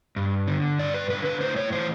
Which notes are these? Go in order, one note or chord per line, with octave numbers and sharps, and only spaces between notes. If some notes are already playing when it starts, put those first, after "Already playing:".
G2
D3
G2 D5
B4
D3 B4
B4
A2 C5
C#5
E3 C5